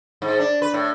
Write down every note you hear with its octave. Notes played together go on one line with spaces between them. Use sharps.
G#2
D4
B4
A2